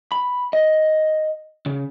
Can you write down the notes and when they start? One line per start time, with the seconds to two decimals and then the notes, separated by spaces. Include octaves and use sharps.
0.12 B5
0.53 D#5
1.66 C#3